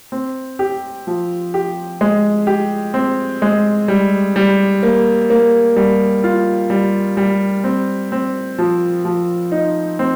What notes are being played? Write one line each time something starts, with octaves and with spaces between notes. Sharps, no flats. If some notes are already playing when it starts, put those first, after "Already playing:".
C4
G4
F3
G4
G#3
G4
C4
G#3
G3
G3
A#3
A#3
G3
F4
G3
G3
C4
C4
F3
F3
D#4
C4